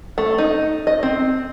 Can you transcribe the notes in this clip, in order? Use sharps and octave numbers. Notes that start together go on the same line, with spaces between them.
A3
D#4
D#5
C4